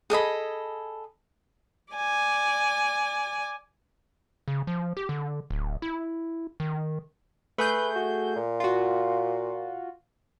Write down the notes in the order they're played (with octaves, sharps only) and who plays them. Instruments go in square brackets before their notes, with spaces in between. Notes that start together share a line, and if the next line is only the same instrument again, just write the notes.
[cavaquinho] G#4 A4 D#5 B5
[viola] D5 G#5
[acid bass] C#3
F3
G4
D3
D1
E4
D#3
[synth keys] A3 G#4 G6 [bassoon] B4
[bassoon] F#4
A#2
[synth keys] F4 F#4